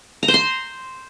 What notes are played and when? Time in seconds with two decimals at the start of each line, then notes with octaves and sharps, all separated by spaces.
0.23 A#5
0.28 C5
0.34 C6